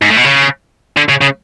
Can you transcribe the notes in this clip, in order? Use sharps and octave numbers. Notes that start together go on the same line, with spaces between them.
G#2
A2
B2
C#3
D3
C#3
C#3